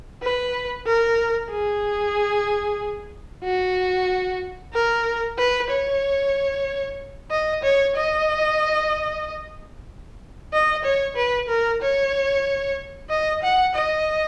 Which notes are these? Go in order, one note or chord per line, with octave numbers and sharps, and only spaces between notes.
B4
A#4
G#4
F#4
A#4
B4
C#5
D#5
C#5
D#5
D#5
C#5
B4
A#4
C#5
D#5
F#5
D#5